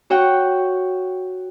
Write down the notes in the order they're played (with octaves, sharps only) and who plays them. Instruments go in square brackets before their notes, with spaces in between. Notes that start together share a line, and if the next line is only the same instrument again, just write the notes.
[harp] F#4 C#5 F#5 G5